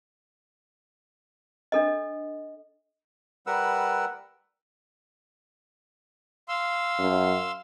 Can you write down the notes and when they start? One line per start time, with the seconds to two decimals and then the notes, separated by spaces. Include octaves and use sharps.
1.72 D4 A4 D#5
3.47 G3 A#4 B4 F#5 E6
6.49 F5 C6 E6
6.99 F#2